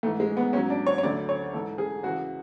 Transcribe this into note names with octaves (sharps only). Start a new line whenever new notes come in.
G#2 E3 A3
G#3
B3
G#2 F#3 C#4
D4
C#5
C#5
D2 D3 F#3 D5
C#5
G#2 E3 A4
G#4
C#2 C#3 E3 F#4